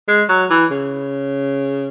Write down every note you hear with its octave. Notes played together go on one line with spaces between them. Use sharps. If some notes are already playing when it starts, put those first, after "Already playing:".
G#3
F#3
E3
C#3